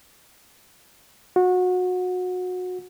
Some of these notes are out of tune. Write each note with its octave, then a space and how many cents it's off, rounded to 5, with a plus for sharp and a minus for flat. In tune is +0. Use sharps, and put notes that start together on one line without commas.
F#4 -25